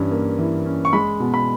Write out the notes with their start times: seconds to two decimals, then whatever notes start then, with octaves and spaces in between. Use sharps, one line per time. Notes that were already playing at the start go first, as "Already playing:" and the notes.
Already playing: G2 E3 C#4
0.12 A#3
0.39 E3
0.66 C#4
0.85 C#6
0.93 G#3 B5
1.20 B2
1.34 B5